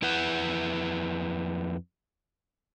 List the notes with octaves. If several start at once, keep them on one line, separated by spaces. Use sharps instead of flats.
F2 E4 B4 F#5